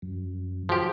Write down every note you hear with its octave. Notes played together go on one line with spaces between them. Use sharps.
F#2
F3 F#3 G4 G#4